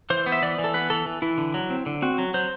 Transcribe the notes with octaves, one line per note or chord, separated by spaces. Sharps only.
E3 C5
B3
E5
E3 D5
E3
A4
B3 B4
E3 A4
E3
E3 E4
D3
F#3
C4
D3
C4 F#4
F#3
F#3 C5